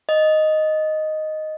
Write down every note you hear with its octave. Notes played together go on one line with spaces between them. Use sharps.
D#5